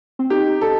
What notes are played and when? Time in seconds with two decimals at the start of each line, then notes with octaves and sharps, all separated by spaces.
0.19 C4
0.30 D#4 G4
0.61 A4